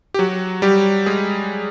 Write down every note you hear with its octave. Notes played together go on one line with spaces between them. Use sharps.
G4
F#3 F#4
G3 G4
G#3 G#4